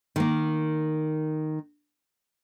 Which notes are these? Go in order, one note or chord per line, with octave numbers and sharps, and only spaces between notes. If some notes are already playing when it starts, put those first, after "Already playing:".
D#3 A#3